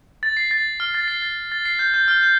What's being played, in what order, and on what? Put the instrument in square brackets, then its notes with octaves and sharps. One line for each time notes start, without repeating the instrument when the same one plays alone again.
[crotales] A6
C7
A6
F6
A6
C7
A6
A6
C7
G6
G6
F6
G6